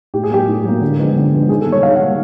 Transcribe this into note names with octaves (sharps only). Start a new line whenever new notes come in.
A2 G4
G#4
F#3 A#3 G4
A2
F#3 A#3
D3
F3 G#3 B3
D3
F3 G#3 B3
D#3 G#4
A4
G3 A#3
C#5
D#3 F5
F#5
G3 A#3